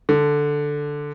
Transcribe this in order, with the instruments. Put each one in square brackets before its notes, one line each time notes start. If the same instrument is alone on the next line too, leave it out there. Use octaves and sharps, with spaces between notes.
[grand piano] D3